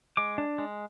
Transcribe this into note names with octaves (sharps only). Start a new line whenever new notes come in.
G#3 D6
D4
G#3